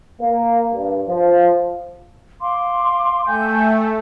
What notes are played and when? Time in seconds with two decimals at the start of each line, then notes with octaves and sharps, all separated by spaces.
0.21 A#3
0.74 G2
1.08 F3
2.42 F5 C6 D6
3.26 A3 G5 G#5 G6